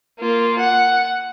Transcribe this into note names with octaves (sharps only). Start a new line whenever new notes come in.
A#3 F4
F#5